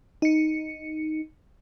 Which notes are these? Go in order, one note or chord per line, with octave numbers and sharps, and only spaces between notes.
D#4 C#7